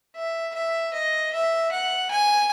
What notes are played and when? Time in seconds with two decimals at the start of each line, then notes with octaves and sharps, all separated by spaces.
0.16 E5
0.55 E5
0.94 D#5
1.33 E5
1.72 F#5
2.11 G#5